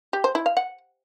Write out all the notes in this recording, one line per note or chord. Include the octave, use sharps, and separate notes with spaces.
G4
C5
E4
F5
F#5